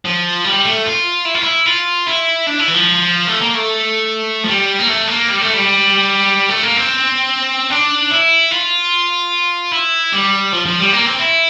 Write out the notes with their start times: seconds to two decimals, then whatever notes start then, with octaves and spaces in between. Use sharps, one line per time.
0.05 F3
0.45 G3
0.65 A3
0.86 F4
1.25 E4
1.34 F4
1.43 E4
1.66 F4
2.06 E4
2.46 D4
2.59 E4
2.68 E3
2.74 F3
3.27 A3
3.41 A#3
3.54 A3
4.44 F3
4.48 G3
4.80 A#3
4.88 A3
5.09 A#3
5.29 G3
5.41 A3
5.54 G3
6.49 A3
6.63 A#3
6.77 C4
7.70 D4
8.11 E4
8.51 F4
9.72 E4
10.13 G3
10.52 F3
10.66 F3
10.79 G3
10.93 A#3
11.06 C4
11.19 E4